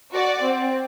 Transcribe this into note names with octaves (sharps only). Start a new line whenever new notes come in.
F#4 D5
C4